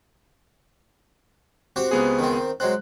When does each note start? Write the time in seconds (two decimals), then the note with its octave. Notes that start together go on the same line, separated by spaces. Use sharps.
1.76 C4 F#4 G4
1.91 C#2 B3 G#4
2.19 D#3 C4
2.60 F#3 G#3 C4 F#6